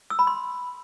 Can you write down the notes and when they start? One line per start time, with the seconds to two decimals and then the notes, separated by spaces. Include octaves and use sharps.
0.10 E6
0.19 B5
0.27 C6